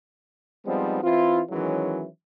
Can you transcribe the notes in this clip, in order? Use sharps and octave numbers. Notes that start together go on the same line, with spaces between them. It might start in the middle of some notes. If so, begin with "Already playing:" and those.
F3 G3 G#3 B3 C4 D#4
E3 C4 E4 F4
D#3 E3 F#3 G#3 C#4 E4